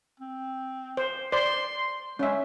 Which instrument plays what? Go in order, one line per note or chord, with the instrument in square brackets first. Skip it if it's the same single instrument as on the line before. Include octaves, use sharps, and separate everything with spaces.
[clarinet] C4
[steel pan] C5
[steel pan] C5 D5 [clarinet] C6
[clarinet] G#3 [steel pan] C#4 E5